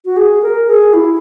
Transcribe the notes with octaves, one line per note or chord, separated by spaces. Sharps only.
F#4
G#4
A#4
G#4
E4